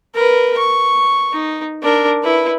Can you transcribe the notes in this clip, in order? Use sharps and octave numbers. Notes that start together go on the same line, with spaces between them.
A#4 B4
C#6
D#4
D4 A#4
E4 B4